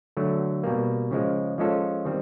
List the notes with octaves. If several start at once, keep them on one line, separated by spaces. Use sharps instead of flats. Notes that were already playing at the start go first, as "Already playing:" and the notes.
D3 F#3 A3
B2 G3 A#3
C#3 F3 G#3
F3 G#3 C#4 F4 A4
D#3 G3 C4